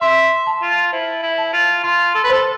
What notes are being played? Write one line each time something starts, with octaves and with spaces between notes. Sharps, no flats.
E5 C6
A5
F4
E4 C5
E4
A5
F4
F4 C6
A4
B4
A4 C5